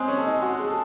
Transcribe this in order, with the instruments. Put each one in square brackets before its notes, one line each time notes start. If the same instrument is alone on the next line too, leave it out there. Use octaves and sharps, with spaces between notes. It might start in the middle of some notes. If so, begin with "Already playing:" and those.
Already playing: [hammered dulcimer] G#3 [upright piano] C4
[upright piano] C#4
[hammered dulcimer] A4
[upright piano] D#4
[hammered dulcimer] G#3 [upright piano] F#4
[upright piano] G#4
[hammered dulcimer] A4